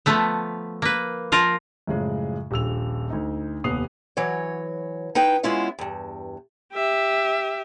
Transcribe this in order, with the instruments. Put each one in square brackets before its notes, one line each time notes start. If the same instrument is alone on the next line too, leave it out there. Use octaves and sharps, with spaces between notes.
[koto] F3 A3 B3
A#3 B4
F3 F4 A#4
[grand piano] F#2 A2 C#3 F3 G#3
D#1 A#1 E6 F7
D2 D#4
F1 D#2 B3 D#6 C7 F7
[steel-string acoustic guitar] E3 F#3 C#5
D#4 E4 B4 G5
G#3 B3 C#4 E4 F4 E5
E2 G2
[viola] G4 E5